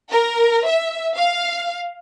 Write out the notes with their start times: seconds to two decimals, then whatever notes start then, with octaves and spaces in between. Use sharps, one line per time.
0.11 A#4
0.66 E5
1.15 F5